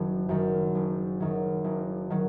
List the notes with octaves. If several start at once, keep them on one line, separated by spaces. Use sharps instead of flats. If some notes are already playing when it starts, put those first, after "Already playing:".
Already playing: F#1 F#2 D#3 F#3
F#2 D#3 F#3
F#1
F#2 D#3 F#3
F#1
D#3 F#3